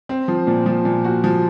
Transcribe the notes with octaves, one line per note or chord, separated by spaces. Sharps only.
C4
F3
A#2
F3
A#2
F#4
F3